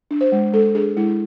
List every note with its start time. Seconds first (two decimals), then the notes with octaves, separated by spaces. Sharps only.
0.11 D4
0.21 C5
0.32 G#3
0.53 G#3 A4
0.75 D4 G#4
0.97 G#3 E4